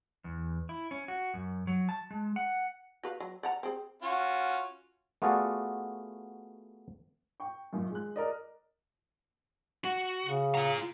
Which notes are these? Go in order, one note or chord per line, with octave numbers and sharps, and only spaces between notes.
E2
E4
C#4
F#4
F#2
F#3
A5
G#3
F#5
F#4 B4 F5
F#3
D5 F#5 A#5
C4 G#4
C#4 F4 F#4
A3 B3 F4 F#4 G#4 D5
G5 C#6
F#2 A#2 D#3
G#3 F#6
A#4 D5 D#5
F#4
C#3
F4 A#5